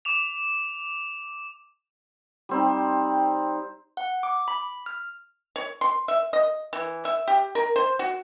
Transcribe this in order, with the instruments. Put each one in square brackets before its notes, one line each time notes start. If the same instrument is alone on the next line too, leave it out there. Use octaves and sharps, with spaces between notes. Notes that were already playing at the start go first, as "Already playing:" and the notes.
[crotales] D6 E7 F7
[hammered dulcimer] G3 C4 D#4
[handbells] F#5
D6
B5
F6
[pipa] C#5
C6
E5
D#5
E3
E5
G4
A#4
C5
F#4